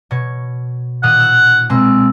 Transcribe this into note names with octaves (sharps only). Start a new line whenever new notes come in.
B2 C#5
A#2 D#3 F#5 D#6
E6 F#6
B2 G#3 A#3 C4 E6